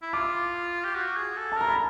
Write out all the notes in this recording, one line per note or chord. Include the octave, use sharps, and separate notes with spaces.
E4
F4 D6
G4
F#4
G#4
A4
A5
A#4 A#5
B5